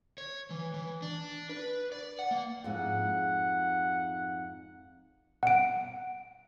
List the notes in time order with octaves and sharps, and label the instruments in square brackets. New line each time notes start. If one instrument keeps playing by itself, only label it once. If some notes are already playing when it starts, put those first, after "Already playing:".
[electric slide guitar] C#5
E3
E3
D4
B4
D5
F#5
A#3
[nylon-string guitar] F2 G#2 [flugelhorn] F#5
[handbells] F#5 D7